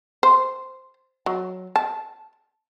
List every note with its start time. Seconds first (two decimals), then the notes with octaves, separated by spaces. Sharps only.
0.23 C5
1.26 F#3
1.76 A5